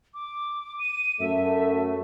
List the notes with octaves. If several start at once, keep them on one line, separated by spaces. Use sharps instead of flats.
D6
D#7
F#2 A3 E5